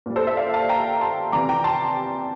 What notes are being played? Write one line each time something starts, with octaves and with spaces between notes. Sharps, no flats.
A#2 G3
A4 C5
C5 E5
D5 F5
F5 A5
G5 A#5
A5 C6
C3 E3 G3 A#5 D6
G5 A#5
A5 C6